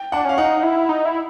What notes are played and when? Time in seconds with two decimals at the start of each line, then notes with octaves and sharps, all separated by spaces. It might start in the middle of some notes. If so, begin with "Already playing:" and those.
Already playing: G5
0.12 D4 F#5
0.25 C#4 F5
0.38 D#4 F#5
0.63 E4
0.89 D#4
1.05 E4